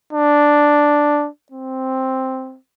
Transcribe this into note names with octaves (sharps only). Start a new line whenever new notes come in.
D4
C4